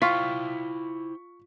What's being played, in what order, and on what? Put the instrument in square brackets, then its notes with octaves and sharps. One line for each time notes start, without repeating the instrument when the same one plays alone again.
[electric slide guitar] E4 C5 G5 [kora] F4 [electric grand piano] C#6 B6